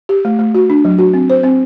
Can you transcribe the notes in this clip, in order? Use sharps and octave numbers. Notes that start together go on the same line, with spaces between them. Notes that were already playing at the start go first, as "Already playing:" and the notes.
G4
A3
A3
F#4
D4
F#3
F#4
C4
C5
C4